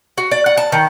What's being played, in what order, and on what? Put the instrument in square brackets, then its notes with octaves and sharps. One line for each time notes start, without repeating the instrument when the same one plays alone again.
[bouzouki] F#4
D5
F#5
A5
D#3